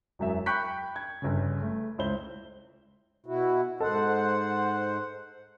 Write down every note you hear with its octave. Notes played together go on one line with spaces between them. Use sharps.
E1 F#2 E5
G5 B5 C#6 F#6 G6 B6
G#6
G1 C#3
A3
C#2 E4 C5 G7
B2 E4 F#4
G#2 A4 C5 D#5 F#5